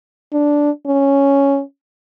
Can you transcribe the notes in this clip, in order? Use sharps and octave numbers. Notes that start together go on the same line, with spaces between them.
D4
C#4